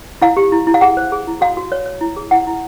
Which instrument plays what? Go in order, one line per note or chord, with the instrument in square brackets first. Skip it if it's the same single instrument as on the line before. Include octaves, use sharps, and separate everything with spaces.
[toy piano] E4 F5
G4
E4
E4
F5
G#4 F#5
C5
G#4
E4
F#4 F5
F#4
C#5
C#5
E4
G#4
E4 F#5
E4